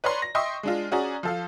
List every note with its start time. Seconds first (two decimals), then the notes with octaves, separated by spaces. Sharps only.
0.04 B4 C#5 D5 A#5 C6
0.22 A#6
0.35 D#5 E5 G5 C6 C#6 D#6
0.63 G#3 D4 F4
0.92 C#4 F#4 G#4 D5 A#5
1.23 F3 A4 F5